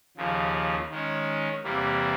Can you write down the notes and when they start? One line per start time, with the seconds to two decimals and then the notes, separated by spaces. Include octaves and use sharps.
0.17 D#2 C#3 F3
0.90 D#3 G#3 C#4
1.63 E2 C3 E3 G3 A#3